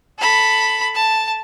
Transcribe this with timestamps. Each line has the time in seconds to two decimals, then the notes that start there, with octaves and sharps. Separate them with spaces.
0.19 A4 B5
0.95 A5